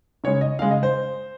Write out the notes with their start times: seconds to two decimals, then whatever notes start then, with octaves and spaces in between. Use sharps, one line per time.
0.24 C#3 G#3 C#5
0.41 D#5
0.59 C#3 G#3 F5
0.71 D#5
0.83 C5